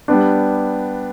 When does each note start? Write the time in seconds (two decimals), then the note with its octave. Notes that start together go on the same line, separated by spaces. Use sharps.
0.08 G3 B3 D4